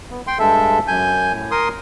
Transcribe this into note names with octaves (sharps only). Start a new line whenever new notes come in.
B3
G5 C6
G2 G#3 A4 E5
F#2 G#5 G6
A2
A#4 C6 D#6